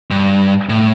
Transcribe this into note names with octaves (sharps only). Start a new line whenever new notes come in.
G2
A2